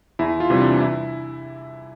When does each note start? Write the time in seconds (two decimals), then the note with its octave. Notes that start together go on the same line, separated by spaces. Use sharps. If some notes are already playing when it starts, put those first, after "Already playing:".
0.19 E2 E4
0.40 F4
0.50 C3 E3 G3
0.61 D4
0.80 E4